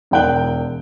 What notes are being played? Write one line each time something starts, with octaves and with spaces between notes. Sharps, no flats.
E1 A#4 G5 F#6 G7